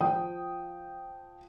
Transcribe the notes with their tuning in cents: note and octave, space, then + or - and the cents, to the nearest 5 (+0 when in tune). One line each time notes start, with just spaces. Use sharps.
F3 +0 G5 -5 D#6 +0